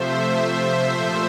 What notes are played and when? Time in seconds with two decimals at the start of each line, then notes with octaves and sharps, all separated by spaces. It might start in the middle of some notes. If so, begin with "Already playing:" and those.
Already playing: C3 F3 A3 C5 E5
0.22 C5 E5
0.55 C5 E5
0.88 A#2 F3 A3